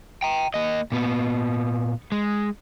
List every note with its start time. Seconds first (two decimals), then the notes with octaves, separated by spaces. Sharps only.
0.22 G5 A#5
0.54 A#3 D#5
0.92 A#2 B3
2.12 G#3